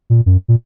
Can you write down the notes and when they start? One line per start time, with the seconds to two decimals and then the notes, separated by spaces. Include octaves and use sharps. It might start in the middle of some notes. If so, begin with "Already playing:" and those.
0.10 A#2
0.26 F#2
0.48 A#2